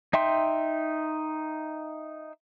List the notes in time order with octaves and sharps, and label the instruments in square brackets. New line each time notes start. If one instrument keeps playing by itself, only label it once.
[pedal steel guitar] D#4 E5 G5 C6